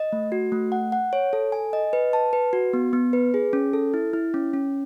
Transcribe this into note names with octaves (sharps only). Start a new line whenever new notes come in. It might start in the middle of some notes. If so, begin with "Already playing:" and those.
Already playing: D#5
A3
F#4
A3
F#5
F#5
C#5
A4
G#5
D#5
B4
A5
B4
F#4
B3
B3
B4
G#4
C#4
A4
E4
E4
C#4
C#4